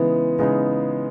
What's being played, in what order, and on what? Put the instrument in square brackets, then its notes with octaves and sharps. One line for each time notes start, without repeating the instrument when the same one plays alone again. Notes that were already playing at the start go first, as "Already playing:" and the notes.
Already playing: [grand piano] C#3 G#3 B3 D#4 [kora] E3
[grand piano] C#3 G#3 B3 D#4